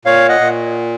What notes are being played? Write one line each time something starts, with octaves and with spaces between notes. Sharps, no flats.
A#2 C#5 F5
D#5 F#5
A#2